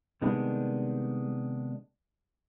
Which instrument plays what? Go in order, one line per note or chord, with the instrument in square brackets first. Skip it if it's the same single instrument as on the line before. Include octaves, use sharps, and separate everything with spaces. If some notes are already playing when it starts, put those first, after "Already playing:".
[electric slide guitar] C3 D#3 G#3 B3 D4 [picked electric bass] G3